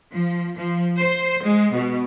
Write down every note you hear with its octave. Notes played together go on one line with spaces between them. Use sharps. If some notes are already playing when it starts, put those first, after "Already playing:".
F3
F3
C5
G#3
B2